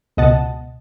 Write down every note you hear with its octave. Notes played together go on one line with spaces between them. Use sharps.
C#2 B2 D#5 F#5 A5